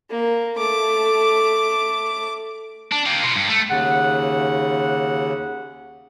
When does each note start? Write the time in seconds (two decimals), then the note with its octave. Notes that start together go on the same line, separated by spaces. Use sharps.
0.10 A#3
0.57 A3 D6
2.92 D4
3.06 A#3 G4
3.23 B2 F4
3.35 G2
3.48 A3
3.70 D#2 C#3 F#5